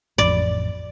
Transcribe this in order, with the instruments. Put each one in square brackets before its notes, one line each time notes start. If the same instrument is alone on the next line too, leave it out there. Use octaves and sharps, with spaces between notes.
[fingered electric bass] A1 F2 [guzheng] D5